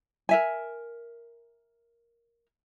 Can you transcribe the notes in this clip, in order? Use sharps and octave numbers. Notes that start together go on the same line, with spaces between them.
A#4 E5 G#5